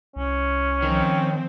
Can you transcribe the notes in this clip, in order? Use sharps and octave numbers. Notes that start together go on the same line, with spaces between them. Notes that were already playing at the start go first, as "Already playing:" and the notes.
C2 C#4
D#3 F3 C4